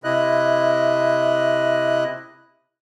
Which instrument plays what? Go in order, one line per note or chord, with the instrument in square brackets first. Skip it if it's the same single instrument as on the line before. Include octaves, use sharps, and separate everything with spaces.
[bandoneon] C3 E4 D#5 F#6